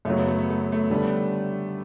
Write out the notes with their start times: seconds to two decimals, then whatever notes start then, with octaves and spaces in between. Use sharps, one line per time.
0.05 F#2 C#3 F#3 A3
0.17 B3
0.28 A3
0.39 B3
0.50 A3
0.61 B3
0.72 A3
0.90 D3 G3 B3 D4 A4